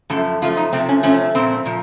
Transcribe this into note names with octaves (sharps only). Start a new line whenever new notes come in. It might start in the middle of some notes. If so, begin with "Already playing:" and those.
F#2 F3 A3 A4
F#2 F3 A3 F4
D#4
C3 F3 A3 C4
C#4
C3 F3 A3 C#4
A#2 F3 A3 C4
A#2 F3